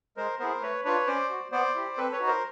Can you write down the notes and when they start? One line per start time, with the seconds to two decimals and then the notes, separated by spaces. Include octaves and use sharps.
0.17 G#3 A#4 C5
0.39 B3 E4 G#4 A#4 C5
0.61 A3 B4 C#5
0.85 D4 F4 B4 C#5
1.07 C#4 C5 D5
1.30 F#4
1.52 B3 C5 D5
1.75 E4 G4
1.97 C4 A4 B4
2.12 B4 C#5
2.20 D#4 F#4
2.27 A#4 C5